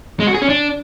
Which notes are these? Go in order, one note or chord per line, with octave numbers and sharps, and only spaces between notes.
G#3
F#4
G#4
C#4
D4